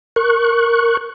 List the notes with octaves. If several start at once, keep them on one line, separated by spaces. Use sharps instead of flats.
A#4 C#6 F#6